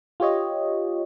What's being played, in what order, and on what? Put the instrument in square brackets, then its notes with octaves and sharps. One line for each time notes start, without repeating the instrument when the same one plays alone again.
[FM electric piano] F4 G4 C#5 D#5